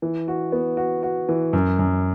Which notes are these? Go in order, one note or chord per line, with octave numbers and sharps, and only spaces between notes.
E3
F#4
B3
F#4
F#4
E3
F#2
F#2